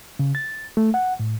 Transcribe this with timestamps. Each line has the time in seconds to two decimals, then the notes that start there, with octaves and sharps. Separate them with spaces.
0.19 C#3
0.35 A6
0.77 A3
0.94 F#5
1.20 A2